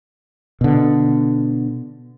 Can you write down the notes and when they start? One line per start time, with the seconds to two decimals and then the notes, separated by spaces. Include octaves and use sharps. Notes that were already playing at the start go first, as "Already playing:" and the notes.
0.61 B2 D3